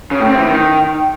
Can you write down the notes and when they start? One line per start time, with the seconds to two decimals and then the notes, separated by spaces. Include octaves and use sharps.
0.11 C#3
0.20 A2
0.29 C4
0.37 E3
0.46 D#3